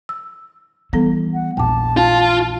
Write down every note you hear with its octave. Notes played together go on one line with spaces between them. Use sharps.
E6
E3 G3 B3 A4
F#5
A#1 E2 G5 A5 D6
F4